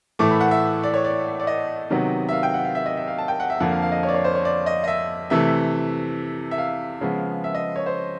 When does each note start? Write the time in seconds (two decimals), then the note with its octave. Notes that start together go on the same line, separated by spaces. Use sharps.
0.19 A2 E3 A3 D6
0.31 B5
0.40 F#5
0.51 E5
0.83 D5
0.94 C#5
1.05 D5
1.40 D5
1.47 D#5
1.90 C3 D#3 F#3 B3
2.29 E5
2.32 F5
2.43 G5
2.54 F#5
2.65 F5
2.75 E5
2.86 D#5
2.97 E5
3.08 F5
3.18 A5
3.28 G5
3.40 F#5
3.50 E5
3.60 F2 D3 F3 A#3 F#5
3.72 F5
3.82 F5
3.92 D#5
4.03 C#5
4.08 D5
4.14 C#5
4.24 C5
4.35 C#5
4.45 D5
4.66 D#5
4.84 D#5
4.88 E5
5.30 C3 E3 A3 E5
6.51 E5
6.58 F5
7.01 C#3 F3 G#3 B3
7.44 E5
7.55 D#5
7.76 C#5
7.86 C5